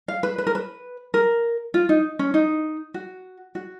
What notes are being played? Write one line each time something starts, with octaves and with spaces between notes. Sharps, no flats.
F5
B4
B4
A#4
B4
A#4
F4
D#4
C#4
D#4
F#4
F#4